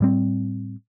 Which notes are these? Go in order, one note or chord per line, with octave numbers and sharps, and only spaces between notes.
A2 G3 C4